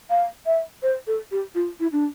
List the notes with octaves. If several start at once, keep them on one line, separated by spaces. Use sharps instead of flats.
F5
E5
C5
A4
G4
F4
E4
D4